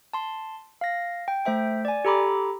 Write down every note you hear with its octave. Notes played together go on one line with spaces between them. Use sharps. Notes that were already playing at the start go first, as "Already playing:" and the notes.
A5 C6
F5 A#6
G5
A3 C5 E5 G5
D5 G#5
G4 A4 A#5 B5 D6